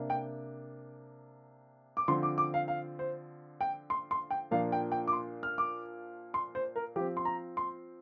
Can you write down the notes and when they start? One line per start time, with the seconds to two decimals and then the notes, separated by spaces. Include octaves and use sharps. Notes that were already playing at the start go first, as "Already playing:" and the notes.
Already playing: C3 A#3 D4
0.10 G5
1.97 D6
2.08 D3 F3 C4 C6
2.23 D6
2.38 D6
2.54 F5
2.68 F5
2.99 C5
3.61 G5
3.90 C6
4.11 C6
4.31 G5
4.51 A#2 F3 A#3 D4 F5
4.72 G5
4.92 G5
5.08 D6
5.13 C6
5.43 F6
5.58 D6
6.34 C6
6.55 C5
6.76 A#4
6.96 F3 G4
7.00 C4
7.17 C6
7.25 A#5
7.57 C6